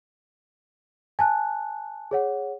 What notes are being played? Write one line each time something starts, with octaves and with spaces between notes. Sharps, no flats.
G#5 A5 F#6
G#4 C#5 F#5